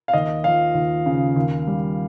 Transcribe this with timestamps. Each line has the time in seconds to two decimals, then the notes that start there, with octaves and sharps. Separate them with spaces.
0.08 F5
0.13 D#2 D#5
0.44 F3 F5
0.74 D#2
1.06 C#3
1.36 D#2
1.67 G3